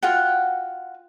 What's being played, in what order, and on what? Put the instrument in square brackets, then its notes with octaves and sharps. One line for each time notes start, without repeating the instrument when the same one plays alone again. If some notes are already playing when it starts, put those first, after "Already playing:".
[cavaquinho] F4 F#4 F#5 G5